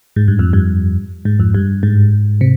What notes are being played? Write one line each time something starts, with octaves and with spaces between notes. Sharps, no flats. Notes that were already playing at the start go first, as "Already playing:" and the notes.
G#2
G2
F2
G2
G#2
F2
G2
G#2
C3